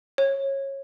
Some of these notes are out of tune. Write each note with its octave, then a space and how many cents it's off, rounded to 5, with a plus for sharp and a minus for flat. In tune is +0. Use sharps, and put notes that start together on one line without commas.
C#5 -20